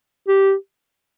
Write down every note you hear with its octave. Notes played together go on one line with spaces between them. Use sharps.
G4